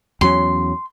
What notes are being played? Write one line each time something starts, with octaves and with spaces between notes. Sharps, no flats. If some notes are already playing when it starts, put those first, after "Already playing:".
E2 F#3 C#4 C6